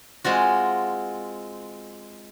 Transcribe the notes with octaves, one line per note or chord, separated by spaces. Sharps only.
G#3 C4 F4 F#4